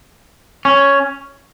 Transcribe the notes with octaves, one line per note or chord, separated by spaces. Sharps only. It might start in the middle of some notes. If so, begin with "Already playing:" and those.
C#4